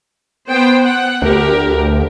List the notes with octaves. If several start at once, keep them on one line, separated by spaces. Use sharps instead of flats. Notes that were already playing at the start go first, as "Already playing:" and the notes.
B3 C5 G5
F#5
D2 G4 A#4